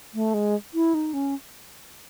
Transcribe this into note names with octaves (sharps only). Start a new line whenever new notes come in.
A3
G#3
E4
D#4
C#4